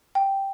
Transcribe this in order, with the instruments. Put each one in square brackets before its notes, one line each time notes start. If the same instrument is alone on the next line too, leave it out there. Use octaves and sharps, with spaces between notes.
[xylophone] G5